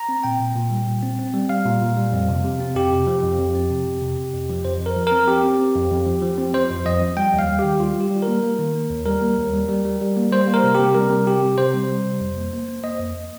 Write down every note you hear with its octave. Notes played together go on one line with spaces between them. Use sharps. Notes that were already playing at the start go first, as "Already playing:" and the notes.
Already playing: A#5
C4
A#2 G5
A#2
A#2
G3
A#2
C4
C4
G3
G3 F5
A#2
A#2
G3
F2
C3
C3
C4
F2 G4
C3
F3
F2
F2
C4
C3
F2
C3
C3
F2
F3
F2 C5
F2
A#4
F3
C4 A#4
C4 G4
C4
C4
F2
F2
F3
F3
C4
F3 C5
F2
F2 D#5
F3
G3 G5
D#2
F5
G3
D#3 G4
G3 F4
G3
G4
G3
A#4
A#3
A#3
D#3
A#3
D#2
G3 A#4
A#3
D#2
G3
G3
G3
G3
A#3
G3 C5
A#3
A#4
C3
C3 G4
G3 A#4
C3
C3 G4
C3
C3 C5
G3
G3
C3
F2
A#3
A#3
A#3
A#3 D#5
F2